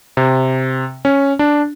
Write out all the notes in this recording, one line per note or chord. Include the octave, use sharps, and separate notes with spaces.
C3
C#4
D4